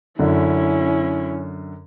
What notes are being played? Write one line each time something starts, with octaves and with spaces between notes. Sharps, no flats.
F#2 D3 C#4 E4